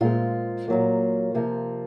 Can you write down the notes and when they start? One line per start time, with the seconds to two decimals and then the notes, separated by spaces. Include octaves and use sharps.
0.01 A#2 G#3 C4 F4
0.68 A#2 F#3 A#3
1.34 C3 F3 A#3